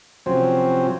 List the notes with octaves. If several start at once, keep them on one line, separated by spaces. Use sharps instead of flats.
C3 F3 F#3 C4 C#4